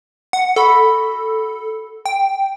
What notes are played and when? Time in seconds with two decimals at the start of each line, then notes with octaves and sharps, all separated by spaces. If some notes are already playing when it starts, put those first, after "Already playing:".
0.33 F#5
0.56 F#4 A4 B5
2.06 G5